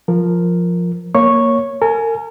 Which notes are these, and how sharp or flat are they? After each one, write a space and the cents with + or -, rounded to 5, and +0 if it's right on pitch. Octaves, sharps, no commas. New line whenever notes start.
F3 +0 A#4 +0
A#3 +0 C#5 +0 C#6 -5
A#4 -35 G#5 +15